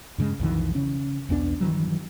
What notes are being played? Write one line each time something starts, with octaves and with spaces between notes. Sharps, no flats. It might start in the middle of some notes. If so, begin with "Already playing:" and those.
G2 C#3 G#3
B1 F2 D#3 E3
C#3 C#4
B1 E2 B3 D4
G2 D#3 E3 F#3